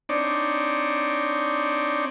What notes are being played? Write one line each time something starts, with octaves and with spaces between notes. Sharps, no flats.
C4 D4 D#4 C#5 D5